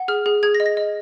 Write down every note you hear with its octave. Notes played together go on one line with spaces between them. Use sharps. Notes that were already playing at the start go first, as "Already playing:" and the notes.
Already playing: F#5
G#4 F6
G#4
G#4 G#6
A#6
D#5
A#6
D#5